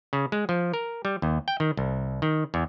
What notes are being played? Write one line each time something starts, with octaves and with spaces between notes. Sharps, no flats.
C#3
G#3
F3
A#4
G3
D#2
G5
D#3
C2
D#3
E2